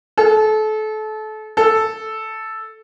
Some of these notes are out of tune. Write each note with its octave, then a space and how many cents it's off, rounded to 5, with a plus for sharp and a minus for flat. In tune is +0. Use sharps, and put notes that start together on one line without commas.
A4 -30
A4 -5